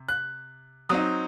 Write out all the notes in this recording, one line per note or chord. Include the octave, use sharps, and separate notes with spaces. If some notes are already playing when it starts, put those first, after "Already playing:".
Already playing: C3
F#6
F#3 C4 D#4 D#6